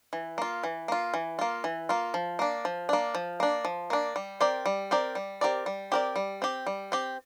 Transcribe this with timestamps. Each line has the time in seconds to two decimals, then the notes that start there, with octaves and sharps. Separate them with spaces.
0.13 E3
0.38 A#3 F4
0.64 E3
0.88 A#3 F4
1.14 E3
1.39 A#3 F4
1.64 E3
1.89 A#3 F4
2.14 F3
2.39 A#3 D4
2.65 F3
2.89 A#3 D4
3.15 F3
3.40 A#3 D4
3.65 F3
3.90 A#3 D4
4.16 G3
4.41 C4 G4 A#4 D5
4.66 G3
4.91 C4 G4 A#4 D5
5.15 G3
5.41 C4 G4 A#4 D5
5.66 G3
5.92 C4 G4 A#4 D5
6.16 G3
6.42 C4 G4
6.67 G3
6.92 C4 G4